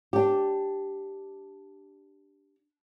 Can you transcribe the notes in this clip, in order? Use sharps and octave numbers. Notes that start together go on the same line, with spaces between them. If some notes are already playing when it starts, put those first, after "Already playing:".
D4 G4